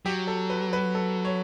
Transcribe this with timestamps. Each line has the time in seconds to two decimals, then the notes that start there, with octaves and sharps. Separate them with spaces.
0.06 F#3 G4
0.27 A4
0.50 B4
0.73 B4
0.95 A4
1.25 C#5